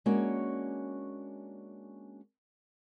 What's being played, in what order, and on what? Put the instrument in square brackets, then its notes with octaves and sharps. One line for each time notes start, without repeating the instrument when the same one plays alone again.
[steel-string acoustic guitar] G#3 A#3 C#4 D4 F#4 C#5